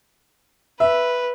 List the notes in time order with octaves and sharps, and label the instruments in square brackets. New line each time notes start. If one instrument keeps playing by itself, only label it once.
[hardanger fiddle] B4 [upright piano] E5